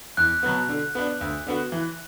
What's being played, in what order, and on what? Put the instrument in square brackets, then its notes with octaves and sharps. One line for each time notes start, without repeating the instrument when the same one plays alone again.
[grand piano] E2 [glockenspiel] F#6
[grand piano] B2 F#3 B3
D3
B3 D4
D2
D3 B3 F#4
E3